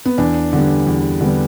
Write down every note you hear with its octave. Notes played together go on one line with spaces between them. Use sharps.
B3
E2 D4
D3 G3 B3
E2
D3 G3 B3